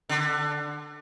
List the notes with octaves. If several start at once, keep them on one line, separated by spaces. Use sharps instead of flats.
D3